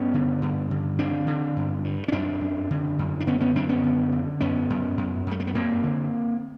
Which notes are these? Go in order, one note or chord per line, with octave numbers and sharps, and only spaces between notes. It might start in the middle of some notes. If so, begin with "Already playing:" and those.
Already playing: G2 B3 C#4
D3
G2
D3
D3 C4 D4
D3
G2
G2
C#4
F#2 C4 D4
F#2
D3
F#2
D4
D3 B3 C#4
B3 C#4
F#2 C4 D4
B3 C#4
D3
D3
F#2 B3 C#4
F#2
F#2
F#2 A3
A#3
B3
F#2 A#3 C4
D3